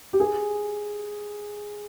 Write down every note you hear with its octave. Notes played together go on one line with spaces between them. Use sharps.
G4
G#4